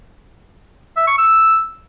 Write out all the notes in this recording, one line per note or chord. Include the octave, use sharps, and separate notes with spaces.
E5
C#6
E6